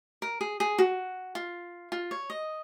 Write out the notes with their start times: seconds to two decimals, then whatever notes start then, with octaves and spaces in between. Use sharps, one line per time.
0.22 A#4
0.41 G#4
0.60 G#4
0.78 F#4
1.35 F4
1.92 F4
2.11 C#5
2.30 D#5